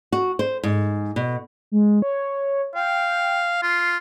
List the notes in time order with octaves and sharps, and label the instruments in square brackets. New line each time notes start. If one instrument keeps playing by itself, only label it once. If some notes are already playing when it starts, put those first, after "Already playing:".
[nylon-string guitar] F#4
C5
G#2
B2
[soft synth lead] G#3
C#5
[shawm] F5 [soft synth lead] G5
[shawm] F4 [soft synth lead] C7